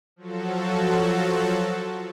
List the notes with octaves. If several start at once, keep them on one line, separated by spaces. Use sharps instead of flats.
F3 F#3 F#4 A4